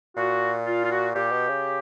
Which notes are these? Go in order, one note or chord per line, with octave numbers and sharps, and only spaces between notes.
A#2 F#4
F4
F4
F#4
A#2 G4
B2
C#3